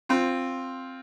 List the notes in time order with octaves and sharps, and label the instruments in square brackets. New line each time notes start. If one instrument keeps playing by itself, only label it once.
[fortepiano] C4 F4